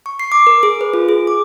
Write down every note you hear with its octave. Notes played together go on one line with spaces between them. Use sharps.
C#6
C7
D6
A#4
G#4
B4
F4
G#4
D6